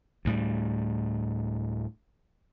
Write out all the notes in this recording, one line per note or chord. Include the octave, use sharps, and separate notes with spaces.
D2 A2 G3